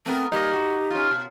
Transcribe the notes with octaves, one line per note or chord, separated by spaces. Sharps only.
A3 B3 C4 A#4
G3 A#3 D#4 G4 D#5
F#4
C#4 F4
B2